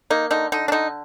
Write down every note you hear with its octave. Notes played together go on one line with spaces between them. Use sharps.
A#3 D#4
D3 D#4
D3 D#4
D4
D3 D#4